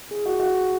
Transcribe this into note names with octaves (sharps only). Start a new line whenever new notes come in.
G#4
F#4
F#4